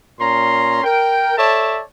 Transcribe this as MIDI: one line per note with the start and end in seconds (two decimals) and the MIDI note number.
0.20 0.82 46
0.20 0.82 61
0.20 0.82 82
0.20 0.82 84
0.84 1.36 70
0.84 1.36 79
1.38 1.82 69
1.38 1.82 73
1.38 1.82 74
1.38 1.82 76
1.38 1.82 81